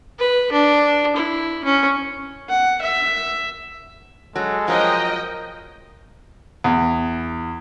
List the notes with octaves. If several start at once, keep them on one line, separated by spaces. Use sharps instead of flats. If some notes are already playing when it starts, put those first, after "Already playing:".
B4
D4
E4
C#4
F#5
E5
F#3 G#3 A4
F3 F#3 A#4 D#5 G5
E2